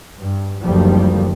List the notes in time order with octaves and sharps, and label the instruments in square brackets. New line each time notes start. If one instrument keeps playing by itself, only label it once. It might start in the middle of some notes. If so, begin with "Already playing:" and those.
[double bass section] G2
F#1 D2 D#3 F3 G3